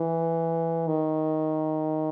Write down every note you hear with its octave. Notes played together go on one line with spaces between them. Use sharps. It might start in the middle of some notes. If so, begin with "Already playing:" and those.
Already playing: E3
D#3